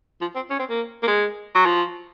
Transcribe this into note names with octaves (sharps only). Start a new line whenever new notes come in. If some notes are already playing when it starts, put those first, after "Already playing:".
F3
C4
C#4
C4
A#3
A#3
G#3
F#3
F3